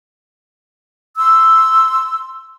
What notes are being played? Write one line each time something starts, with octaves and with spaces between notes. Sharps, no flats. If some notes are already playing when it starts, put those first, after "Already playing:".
C6 E6